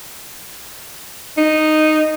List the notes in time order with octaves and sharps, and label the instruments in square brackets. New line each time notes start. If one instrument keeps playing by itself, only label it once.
[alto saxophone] D#4